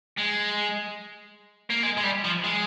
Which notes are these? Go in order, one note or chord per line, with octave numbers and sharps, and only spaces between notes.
G#3
A#3
G#3
G#3
G3
F3
G#3